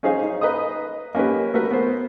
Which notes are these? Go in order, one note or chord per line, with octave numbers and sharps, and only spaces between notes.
C#4 D#4 G#4 C5 F5 G#5
D#4
B4 D#5 A#5 D#6
A#3 C#4 D#4 G4 B4
A3 F#4 A#4 B4
B3 C5